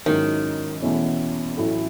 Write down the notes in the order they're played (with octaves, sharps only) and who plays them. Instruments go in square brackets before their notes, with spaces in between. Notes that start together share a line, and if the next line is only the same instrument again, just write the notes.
[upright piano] G#2 F#3 C#4 E4 [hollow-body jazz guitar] D#3
[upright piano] E2 B2 A3 C#4 E4
A1 A2 F#3 C#4 E4